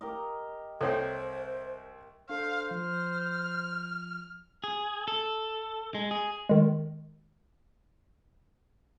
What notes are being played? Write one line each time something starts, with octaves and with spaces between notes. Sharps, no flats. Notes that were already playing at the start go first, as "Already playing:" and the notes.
G4 A#4 D#5
C2 C4 A4 C5 C#5 G5
D4 A4 C5 F5
F3 F6
G#4
A4
G#3
G#4
D#3 G#3